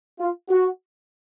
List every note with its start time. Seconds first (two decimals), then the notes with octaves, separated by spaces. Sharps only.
0.19 F4
0.49 F#4